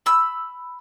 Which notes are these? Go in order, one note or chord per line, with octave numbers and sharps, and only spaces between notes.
B5 E6